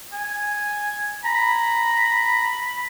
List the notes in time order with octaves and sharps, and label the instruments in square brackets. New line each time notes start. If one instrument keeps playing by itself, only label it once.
[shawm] G#5
[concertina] A#5 [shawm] B5